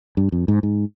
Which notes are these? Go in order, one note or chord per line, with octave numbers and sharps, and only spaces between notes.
G2
F2
G#2
G#2